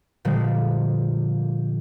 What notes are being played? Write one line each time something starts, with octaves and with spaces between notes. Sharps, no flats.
A#2 D3 F3 G3 G#3